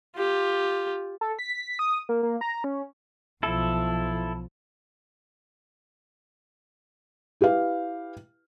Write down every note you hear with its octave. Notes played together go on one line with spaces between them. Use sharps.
F4 G4
A4
B6
D#6
A#3
A#3
A#5
C#4
B1 F3 E4 A4
E4 G4 B4 F5